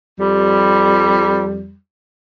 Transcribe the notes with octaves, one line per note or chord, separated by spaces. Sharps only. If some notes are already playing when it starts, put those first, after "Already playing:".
F2 G3